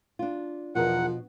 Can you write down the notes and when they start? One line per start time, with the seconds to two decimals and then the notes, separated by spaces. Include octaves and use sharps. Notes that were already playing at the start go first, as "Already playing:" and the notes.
0.19 D4 F4
0.75 E2 B2 F3 A#4 F#5